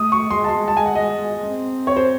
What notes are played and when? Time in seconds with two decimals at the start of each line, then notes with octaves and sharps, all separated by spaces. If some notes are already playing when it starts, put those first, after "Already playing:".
Already playing: A3 D#6
0.12 C#6
0.31 G#3 C6
0.44 A5
0.48 C6
0.68 A5
0.77 G#5
0.86 F#5
0.95 D#5
1.42 C4
1.87 C#5
1.96 C5